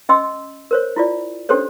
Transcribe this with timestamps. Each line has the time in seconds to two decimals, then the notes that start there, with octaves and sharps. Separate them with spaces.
0.09 C#4 D#5 G5 C6 E6
0.71 A#4 C5 C#5
0.96 E4 F4 D5
1.49 C#4 D4 G4 A4 C5 C#5